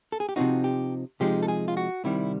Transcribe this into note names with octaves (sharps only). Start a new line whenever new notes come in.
A4
G#4
G4
C3 F3 G#3 C4 D#4 F#4
G4
C3 F3 G#3 C4 D#4 G4
A4
G#4
F4
F#4
C2 C3 D#3 G3 E4